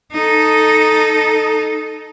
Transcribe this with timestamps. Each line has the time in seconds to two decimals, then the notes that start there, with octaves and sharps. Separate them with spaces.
0.13 D#4 A4